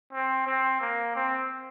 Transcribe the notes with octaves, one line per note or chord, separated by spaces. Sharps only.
C4
C4
A#3
C4